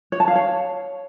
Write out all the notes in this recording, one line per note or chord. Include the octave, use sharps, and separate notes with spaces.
C#5
A5
F5
C#5